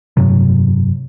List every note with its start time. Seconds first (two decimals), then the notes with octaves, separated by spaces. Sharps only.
0.17 F1 G2 C3 F#3